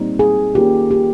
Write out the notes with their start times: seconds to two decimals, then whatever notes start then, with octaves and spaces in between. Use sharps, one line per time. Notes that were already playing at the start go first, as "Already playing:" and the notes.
Already playing: A#2 G3 C4 D#4
0.19 G#4
0.55 D#3 A#3 C#4 F4 G4
0.91 G4